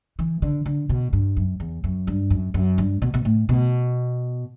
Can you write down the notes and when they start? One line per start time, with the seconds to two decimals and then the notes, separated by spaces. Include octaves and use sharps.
0.19 E3
0.42 D3
0.66 D3
0.89 B2
1.13 G2
1.37 F#2
1.60 E2
1.84 F#2
2.07 G2
2.30 F#2
2.54 F#2
2.78 G2
3.02 B2
3.14 B2
3.25 A2
3.49 B2